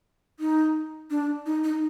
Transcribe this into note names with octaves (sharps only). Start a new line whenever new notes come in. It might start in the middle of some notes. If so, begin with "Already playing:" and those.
D#4
D4
D#4
D#4